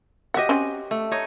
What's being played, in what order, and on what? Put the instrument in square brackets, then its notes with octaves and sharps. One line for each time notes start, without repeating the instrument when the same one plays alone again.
[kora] F#4 G4 D#5 [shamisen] E5 F#5
[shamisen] C4 C#4
[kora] A3
D#4 C#5 D#5